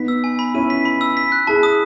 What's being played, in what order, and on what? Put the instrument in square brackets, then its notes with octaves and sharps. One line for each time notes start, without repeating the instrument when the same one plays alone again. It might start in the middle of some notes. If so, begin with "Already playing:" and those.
Already playing: [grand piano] B3 D#4 [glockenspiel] B6
[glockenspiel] E6
G#5
B5
[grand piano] C#4 E4 [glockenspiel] D#7
[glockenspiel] B6
B5
E6
B6
F#6
[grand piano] E4 G#4 [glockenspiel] A5
[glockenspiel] D#6